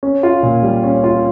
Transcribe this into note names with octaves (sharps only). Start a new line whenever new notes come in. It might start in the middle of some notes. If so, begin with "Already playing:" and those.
C#4
F4
A#2
G3
C#4
F4